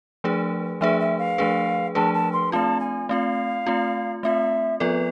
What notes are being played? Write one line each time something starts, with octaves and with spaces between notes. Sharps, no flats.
F3 A3 D4 G#4 B4
F3 A3 D4 G#4 B4 E5
E5
F5
F3 A3 D4 G#4 B4
F3 A3 D4 G#4 B4 A5
A5
C6
A3 C4 F4 A5
G#5
A3 C4 F4 F5
A3 C4 F4
A3 C4 F4 E5
F3 B3 F4 A4 B4 D5